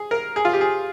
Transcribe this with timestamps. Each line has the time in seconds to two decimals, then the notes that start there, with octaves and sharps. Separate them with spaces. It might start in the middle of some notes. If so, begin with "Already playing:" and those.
Already playing: G#4
0.11 A#4
0.36 G#4
0.45 F4
0.53 G4
0.61 G#4